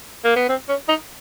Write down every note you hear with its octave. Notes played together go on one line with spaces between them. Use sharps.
A#3
B3
C4
C#4
D#4